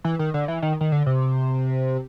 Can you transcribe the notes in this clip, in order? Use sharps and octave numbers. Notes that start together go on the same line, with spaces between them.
E3
D#3
D3
E3
D#3
D#3
D3
C3